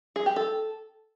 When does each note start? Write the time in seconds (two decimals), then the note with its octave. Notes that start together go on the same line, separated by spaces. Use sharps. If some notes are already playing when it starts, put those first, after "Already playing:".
0.16 G#4
0.26 G4
0.36 A4